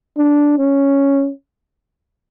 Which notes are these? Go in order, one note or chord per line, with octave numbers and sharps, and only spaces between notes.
D4
C#4